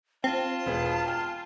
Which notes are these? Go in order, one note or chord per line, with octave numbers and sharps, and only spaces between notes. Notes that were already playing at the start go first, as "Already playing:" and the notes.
C4 F4 A5
E1 B3 G#4
G5 G#5 F6